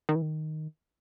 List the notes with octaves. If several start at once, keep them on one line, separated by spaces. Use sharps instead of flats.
D#3
E3
D#3